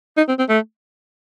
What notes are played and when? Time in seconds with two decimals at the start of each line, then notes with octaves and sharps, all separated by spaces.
0.17 D#4
0.28 C4
0.38 C4
0.49 A3